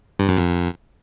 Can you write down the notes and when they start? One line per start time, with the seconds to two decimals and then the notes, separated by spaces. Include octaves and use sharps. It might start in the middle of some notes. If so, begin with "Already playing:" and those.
0.19 G2
0.28 F#2
0.37 F2